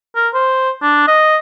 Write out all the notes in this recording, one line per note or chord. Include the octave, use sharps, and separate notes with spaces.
A#4
C5
D4
D#5